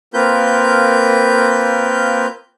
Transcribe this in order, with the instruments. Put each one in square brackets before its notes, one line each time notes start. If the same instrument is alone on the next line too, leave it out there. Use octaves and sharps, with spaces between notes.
[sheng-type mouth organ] A#3 C4 F4 A#4 B4 G6